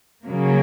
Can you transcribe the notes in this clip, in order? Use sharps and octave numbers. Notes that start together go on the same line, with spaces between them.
C#3 F#3 A#3